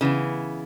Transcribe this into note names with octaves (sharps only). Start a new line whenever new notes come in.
C#3 E3 B3